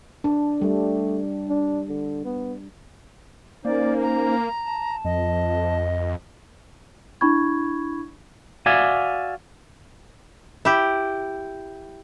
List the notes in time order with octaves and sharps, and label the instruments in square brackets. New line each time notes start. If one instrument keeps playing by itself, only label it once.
[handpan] D4
[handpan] G3 [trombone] A3
[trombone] D4
D3
B3
[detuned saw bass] A#3 [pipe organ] C#4 D#4 C5 [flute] D5
[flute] A#5
[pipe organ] A5
[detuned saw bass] F2 [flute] D#5
[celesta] D4 E4 B5 C#6 G#6
[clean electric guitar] F#4 D5 E5 F5 G#5
[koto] E4 G4